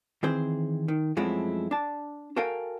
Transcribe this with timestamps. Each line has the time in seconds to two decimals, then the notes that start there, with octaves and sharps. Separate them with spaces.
0.23 D#3 E3 C4 G#4 C5
0.88 D#3
1.17 F#2 F3 G#3 A3 C4 E4
1.71 D4 A5
2.36 F#4 A4 A#4 F5 G5 G#5